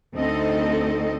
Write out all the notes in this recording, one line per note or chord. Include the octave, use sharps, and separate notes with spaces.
D2 A3 C4 D#4 A4 D#5